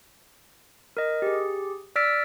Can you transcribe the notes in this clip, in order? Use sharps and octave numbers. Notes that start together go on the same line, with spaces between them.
A#4 D#5
G4 G#4
D5 E6 F6 A6 B6 D7